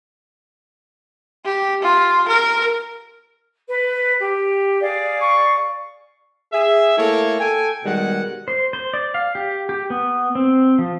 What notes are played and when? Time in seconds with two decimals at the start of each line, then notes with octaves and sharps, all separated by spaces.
1.45 G4
1.82 F4
2.28 A#4
3.68 B4
4.19 G4
4.80 G#4 D5 F5
5.21 C#6
6.52 G#4 E5
6.97 A3 A#3 E4 A4 C#5
7.39 A4 G5 G#5
7.84 B2 D#3 G3 G#3 F#5
8.48 C5
8.73 C5
8.94 D5
9.14 F5
9.35 G4
9.69 G4
9.90 B3
10.35 C4
10.79 F3